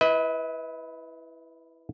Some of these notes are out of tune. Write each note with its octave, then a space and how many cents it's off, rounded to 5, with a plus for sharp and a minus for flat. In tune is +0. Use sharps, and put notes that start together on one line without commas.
E4 +0 B4 +0 D#5 +45